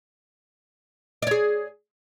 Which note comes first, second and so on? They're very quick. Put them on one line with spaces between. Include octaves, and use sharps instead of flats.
D5 C#5 G#4